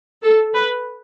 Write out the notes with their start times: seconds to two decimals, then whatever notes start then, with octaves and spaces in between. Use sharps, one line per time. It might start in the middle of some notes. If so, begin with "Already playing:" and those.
0.23 A4
0.54 B4